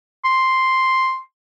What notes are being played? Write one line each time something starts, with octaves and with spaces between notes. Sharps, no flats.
C6